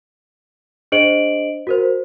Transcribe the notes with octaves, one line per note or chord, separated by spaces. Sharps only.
D4 G#4 C5 D#5 D7 F#7
F#4 A#4 C5